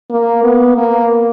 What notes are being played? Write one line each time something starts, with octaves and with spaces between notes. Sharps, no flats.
A#3
B3
A#3